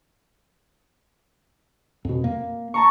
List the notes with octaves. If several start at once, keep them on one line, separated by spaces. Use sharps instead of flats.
F2 B2
A#3
A5 A#5 C#6